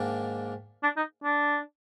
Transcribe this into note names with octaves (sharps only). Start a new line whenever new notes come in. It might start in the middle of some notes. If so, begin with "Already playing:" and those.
Already playing: G#2 D#3 A#3 D4
D4
D#4
D4